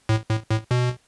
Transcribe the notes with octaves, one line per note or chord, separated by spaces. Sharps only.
A2
A2
A2
B2